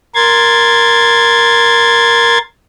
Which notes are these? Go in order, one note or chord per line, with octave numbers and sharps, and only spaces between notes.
A#4 C6 G#6 A6